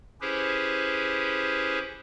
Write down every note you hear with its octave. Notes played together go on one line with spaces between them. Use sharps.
C#4 E4 G4 G#4 B4 C5